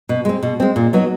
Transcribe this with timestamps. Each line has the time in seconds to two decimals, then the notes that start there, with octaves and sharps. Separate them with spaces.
0.09 B2
0.25 G#3 C4
0.43 B2
0.60 G#3 C4
0.76 A#2
0.93 F#3 B3 D#4 F#4